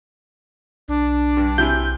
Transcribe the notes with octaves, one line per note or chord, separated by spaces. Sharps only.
B1 D4
G2
C3 E4 G#5 G6